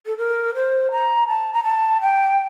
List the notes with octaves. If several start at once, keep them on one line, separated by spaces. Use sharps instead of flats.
A4
A#4
C5
A#5
A5
A#5
A5
G5